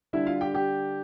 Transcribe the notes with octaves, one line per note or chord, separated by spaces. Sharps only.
D3 G3 D4 E4 E5
F4 F5
G4 G5
G4 G5